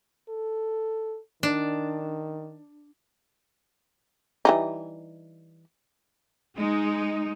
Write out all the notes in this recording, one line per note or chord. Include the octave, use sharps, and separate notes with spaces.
A4
D#3 D4
E3 G3 D#4
G#3 D#4